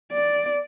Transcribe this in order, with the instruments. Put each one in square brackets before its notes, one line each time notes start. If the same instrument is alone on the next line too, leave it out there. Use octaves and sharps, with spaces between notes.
[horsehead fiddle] D5